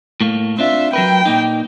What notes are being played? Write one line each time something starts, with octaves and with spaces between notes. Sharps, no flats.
A2 A3 A#3
C4 D4 F4 E5
F#3 A#4 B4 G5
A#2 A#3 D#4